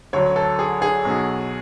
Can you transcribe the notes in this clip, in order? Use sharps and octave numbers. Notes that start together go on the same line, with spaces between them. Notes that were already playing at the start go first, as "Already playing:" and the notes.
D2 D3 F#3 C#5
A4
G#4
G#4
B1 B2 F#3